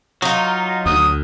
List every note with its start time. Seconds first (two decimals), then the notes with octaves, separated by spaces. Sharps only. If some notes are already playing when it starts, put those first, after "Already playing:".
0.22 F#3 D#4 F4
0.86 D2 D#6